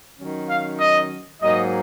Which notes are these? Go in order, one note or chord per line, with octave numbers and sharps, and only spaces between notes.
D#3 F#3 C#4
F5
D#5
G#2 F#3 A#3 D#5